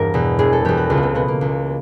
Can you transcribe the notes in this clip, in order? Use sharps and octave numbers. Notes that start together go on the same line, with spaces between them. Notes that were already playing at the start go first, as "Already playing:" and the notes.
Already playing: E1 G2 E3 A#4
E2 B2
E1 G#4
A4
E2 B2 G4
F#4
C#2 F4
B3
C4
B2 B3
A#3
C#2